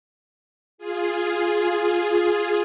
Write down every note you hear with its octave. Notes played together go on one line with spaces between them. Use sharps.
F4 G#4